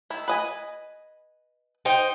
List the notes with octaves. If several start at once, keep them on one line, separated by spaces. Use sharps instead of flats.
D#3 E4
B4 D#5 G#5
D#4 C5 G5